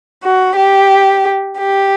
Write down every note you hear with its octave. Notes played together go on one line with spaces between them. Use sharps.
F#4
G4
G4